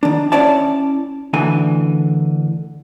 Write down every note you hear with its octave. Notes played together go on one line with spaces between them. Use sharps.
D#3 D4
C#4 E4 C#5 D5 A5
D2 D3 E3 G#5